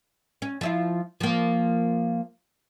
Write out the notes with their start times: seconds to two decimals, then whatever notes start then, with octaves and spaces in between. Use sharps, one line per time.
0.42 C#4
0.61 F3 E4 F4
1.20 F3 A#3